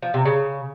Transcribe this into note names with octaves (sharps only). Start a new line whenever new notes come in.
F3
C3
C#3